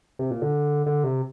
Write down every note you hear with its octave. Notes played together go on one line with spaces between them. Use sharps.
C3
A#2
D3
D3
C3